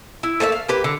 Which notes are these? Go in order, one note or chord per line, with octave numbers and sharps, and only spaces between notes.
E4
A3 A#3 C#5 E5
F5
A#3 G4 B4
D3